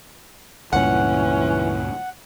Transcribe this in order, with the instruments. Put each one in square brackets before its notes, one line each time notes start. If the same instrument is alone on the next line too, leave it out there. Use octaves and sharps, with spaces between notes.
[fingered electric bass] C#2 G2 A#2 [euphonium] E3 [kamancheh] C#4 [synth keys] F#5